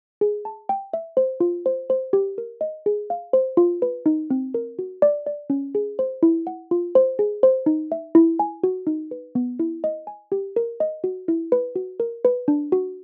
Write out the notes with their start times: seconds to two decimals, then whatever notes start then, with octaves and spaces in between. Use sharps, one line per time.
0.21 G#4
0.45 A5
0.69 G5
0.94 E5
1.17 C5
1.40 F4
1.66 C5
1.90 C5
2.13 G4
2.38 A#4
2.61 D#5
2.86 G#4
3.10 F5
3.33 C5
3.57 F4
3.82 B4
4.06 D#4
4.31 C4
4.54 A#4
4.79 F#4
5.02 D5
5.27 D5
5.50 C#4
5.75 G#4
5.99 C5
6.23 E4
6.47 F#5
6.71 F4
6.95 C5
7.19 G#4
7.43 C5
7.66 D#4
7.92 E5
8.15 E4
8.39 G#5
8.64 F#4
8.87 D#4
9.11 B4
9.35 B3
9.59 E4
9.84 D#5
10.07 G#5
10.32 G4
10.56 A#4
10.80 D#5
11.04 F#4
11.28 E4
11.52 B4
11.76 F#4
12.00 A#4
12.25 B4
12.48 D4
12.72 F#4